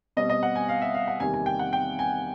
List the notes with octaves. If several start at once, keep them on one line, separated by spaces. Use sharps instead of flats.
B2 G3 C4 D#5
D#5
F#5
G#5
F5
E5
F5
F#5
E2 C3 D#3 G3 A#3 G#5
G#5
G5
F#5
G5
G#5